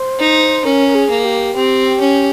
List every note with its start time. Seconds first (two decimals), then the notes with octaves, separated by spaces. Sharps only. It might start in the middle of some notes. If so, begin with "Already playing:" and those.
Already playing: C5
0.19 D#4
0.65 C#4 A#4
0.87 A#4
0.95 G#4
1.10 A#3
1.25 G4
1.55 C4 G4
2.00 C#4